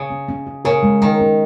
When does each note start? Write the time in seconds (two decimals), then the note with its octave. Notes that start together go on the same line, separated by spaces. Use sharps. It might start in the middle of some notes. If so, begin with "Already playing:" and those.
Already playing: C#3
0.10 C#4
0.28 C#4
0.47 C#4
0.65 C#3 A#4
0.83 G#3
1.02 D#3 G#3
1.20 C#4